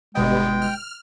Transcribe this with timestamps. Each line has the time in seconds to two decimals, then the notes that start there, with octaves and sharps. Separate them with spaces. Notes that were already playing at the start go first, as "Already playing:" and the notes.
0.15 G1 B2 G3 G#3 B3 D#5 G5
0.62 F6